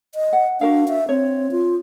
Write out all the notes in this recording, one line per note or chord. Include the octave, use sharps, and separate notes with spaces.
D#5
F#5
D4 F#4 A#4 F5
E5
C4 C#5
F4